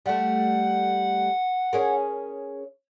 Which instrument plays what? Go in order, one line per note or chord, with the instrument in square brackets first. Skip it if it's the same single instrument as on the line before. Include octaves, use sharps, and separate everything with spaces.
[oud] G3 A3 [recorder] F#5
[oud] C#4 G#4 A#4